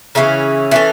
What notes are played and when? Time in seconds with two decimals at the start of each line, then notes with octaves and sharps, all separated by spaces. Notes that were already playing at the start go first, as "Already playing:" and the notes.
0.15 C#3 E3 C#4 E4
0.71 E3 C#4 A4